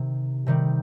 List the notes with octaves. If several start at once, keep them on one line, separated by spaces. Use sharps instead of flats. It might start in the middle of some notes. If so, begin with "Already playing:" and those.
Already playing: C3 D#3
C3 D#3 G3